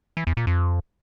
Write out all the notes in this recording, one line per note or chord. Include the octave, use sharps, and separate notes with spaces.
E3
E2
A#2
F2